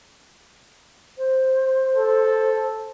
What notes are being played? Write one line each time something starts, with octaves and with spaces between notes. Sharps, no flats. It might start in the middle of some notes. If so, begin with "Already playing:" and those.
C5
A4